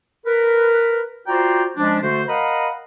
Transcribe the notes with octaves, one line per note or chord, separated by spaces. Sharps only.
A#4 B4
F4 F#4 C5 D5 G5 A#5
F3 G#3 C#4 D4
D3 A3 F#4 C5
A#4 D#5 F5 F#5 A#5 B5